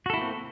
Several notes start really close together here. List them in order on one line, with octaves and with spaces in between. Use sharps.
F#4 A4 E4 A#3 C4